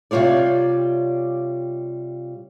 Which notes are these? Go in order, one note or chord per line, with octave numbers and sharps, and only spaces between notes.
C3 G3 F4 C#5 D5